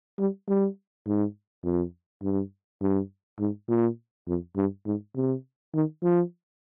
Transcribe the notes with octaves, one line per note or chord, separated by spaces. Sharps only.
G3
G3
G#2
F2
G2
G2
G#2
A#2
F2
G2
G#2
C3
D#3
F3